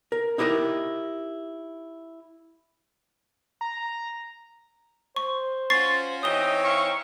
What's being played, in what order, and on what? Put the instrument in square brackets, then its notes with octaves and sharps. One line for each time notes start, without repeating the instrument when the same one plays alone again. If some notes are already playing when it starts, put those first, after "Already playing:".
[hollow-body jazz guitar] A#4
D#4 E4 G4 A#4 D#5
[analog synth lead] A#5
[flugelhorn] C5 [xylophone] C#6
[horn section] C#4 F4 F#4 [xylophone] C#6 A6 C7
[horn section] E3 C4 D#4 [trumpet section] G4 D#5 [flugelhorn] C#5 [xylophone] D#6 G7
[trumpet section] F5 C#6